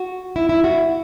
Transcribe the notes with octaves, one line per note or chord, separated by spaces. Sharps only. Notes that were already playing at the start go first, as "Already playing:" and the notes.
Already playing: F#4
E4
E4
F#4